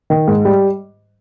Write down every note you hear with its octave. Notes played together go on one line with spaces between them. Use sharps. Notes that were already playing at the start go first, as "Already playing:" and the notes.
D#3
G#2
G3